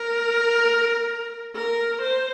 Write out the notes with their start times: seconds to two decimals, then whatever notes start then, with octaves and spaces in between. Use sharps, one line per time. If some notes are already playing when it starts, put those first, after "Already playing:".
Already playing: A#4
1.55 A#4
2.02 C5